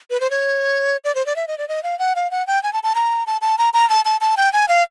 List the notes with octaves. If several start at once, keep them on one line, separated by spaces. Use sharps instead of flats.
B4
C5
C#5
D5
C5
D5
E5
D#5
D5
D#5
F5
F#5
F5
F#5
G5
G#5
A5
A5
A#5
A5
A5
A#5
A#5
A5
A5
A5
G5
G#5
F5